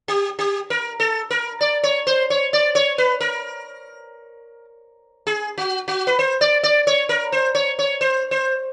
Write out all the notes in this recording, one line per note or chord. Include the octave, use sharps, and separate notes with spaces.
G4
G4
A#4
A4
A#4
D5
C#5
C5
C#5
D5
C#5
B4
A#4
G#4
F#4
F#4
B4
C5
D5
D5
C#5
A#4
C5
C#5
C#5
C5
C5